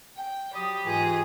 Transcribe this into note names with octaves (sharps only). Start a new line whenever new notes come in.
G5
F#3 G4 D5 B5 D#6
G#2 E3 F4 G#4 D#6